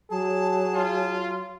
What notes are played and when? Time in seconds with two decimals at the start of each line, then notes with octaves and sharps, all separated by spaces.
0.10 F#3 G#4 A5
0.73 F4